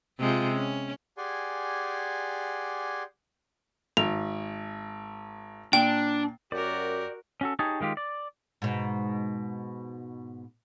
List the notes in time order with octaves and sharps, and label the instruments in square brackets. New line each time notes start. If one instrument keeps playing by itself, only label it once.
[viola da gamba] C3 G#3 F4
C#4
[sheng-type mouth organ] G4 G#4 D5 F#5 G#5 C6
[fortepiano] G#1 [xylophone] F7
[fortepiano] A#2 [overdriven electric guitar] D4 [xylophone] G5
[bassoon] F#2 [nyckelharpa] F#4 A#4 [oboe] G4 [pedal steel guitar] D5
[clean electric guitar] C#4 F#4 A4
D#4 G4 G#4 C#5 A5
D#3 G#3 F4 G4
D5
[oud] G#2 B2